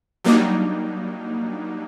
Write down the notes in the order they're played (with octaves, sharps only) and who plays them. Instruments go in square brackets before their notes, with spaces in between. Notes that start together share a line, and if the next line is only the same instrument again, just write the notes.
[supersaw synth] F#3 G3 A#3 D4 D#4